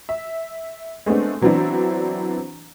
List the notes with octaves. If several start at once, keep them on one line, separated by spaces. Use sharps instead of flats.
E5
G#3 A3 B3 C4 D4
E3 F#3 B3 C4 D4 E4